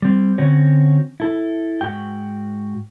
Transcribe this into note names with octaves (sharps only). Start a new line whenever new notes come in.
G3 C4
D3 C4 C#4 F#4 C#5
E4 A4
G#2 F#4 G5